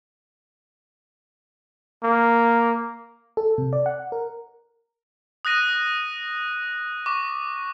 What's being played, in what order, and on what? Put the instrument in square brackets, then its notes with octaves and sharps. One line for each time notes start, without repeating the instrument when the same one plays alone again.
[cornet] A#3
[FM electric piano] A4
C3
D5
F#5
A#4
[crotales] D#6 F#6 A#6 D#7
C#6 D6